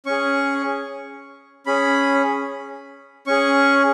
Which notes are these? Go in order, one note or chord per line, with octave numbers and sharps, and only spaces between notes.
C#4 G#4 C#6
C#4 G#4 B5
C#4 G#4 C#6